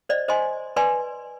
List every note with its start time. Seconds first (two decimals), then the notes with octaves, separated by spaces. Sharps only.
0.09 C5 D5 D#5
0.28 C5 D#5 G#5 C6
0.76 B4 D5 G#5 C6